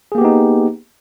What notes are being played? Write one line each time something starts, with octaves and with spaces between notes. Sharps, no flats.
A#3 B3 D#4 G4 G#4